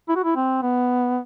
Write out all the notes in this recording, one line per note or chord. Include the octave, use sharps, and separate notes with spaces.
E4
F#4
E4
C4
B3